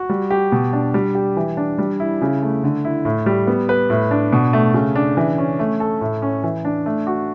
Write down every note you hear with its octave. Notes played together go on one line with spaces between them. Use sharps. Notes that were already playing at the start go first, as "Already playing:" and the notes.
Already playing: F#4
G3
G4
B2
D4
G3
G4
E3
D4
G3
E4
C#3
A3
D3
E4
A2
G3
B3
B4
A2
D4
B2
A3
C#3
D4
E3
C#4
A3
A4
A2
C#4
E3
D4
A3
F#4